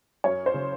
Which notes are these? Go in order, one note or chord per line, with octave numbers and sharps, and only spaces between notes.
F#2 C#5
C5
C#3